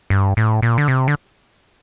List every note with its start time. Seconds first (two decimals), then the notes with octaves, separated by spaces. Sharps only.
0.10 G2
0.37 A2
0.62 A#2
0.78 D3
0.88 C3
1.08 D3